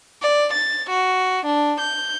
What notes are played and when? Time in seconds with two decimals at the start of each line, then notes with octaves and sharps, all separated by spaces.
0.22 D5
0.53 A6
0.90 F#4
1.46 D4
1.80 G6